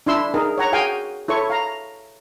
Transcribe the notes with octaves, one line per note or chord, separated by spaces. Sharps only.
D4 E4 C6 E6
D#4 G#4 A#4
C#5 F#5 A#5
F#4 G#4 F5 G5 G#5
E4 A4 C#5 C#6
F5 A#5